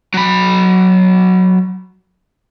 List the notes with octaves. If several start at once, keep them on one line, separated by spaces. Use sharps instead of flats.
F#3 B5